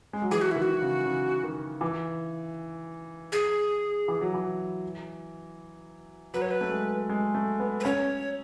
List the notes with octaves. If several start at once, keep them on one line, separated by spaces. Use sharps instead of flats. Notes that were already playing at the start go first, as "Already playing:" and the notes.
G#3
F#3
E3 G#4
F#4
D#3 E4
F#4
C#3
C#3
D#3
E3
G#4
E3
F#3
E3
F#3 B4
C#5
B4
A3
G#3
G#3
A3
B3
B4
C#4 C#5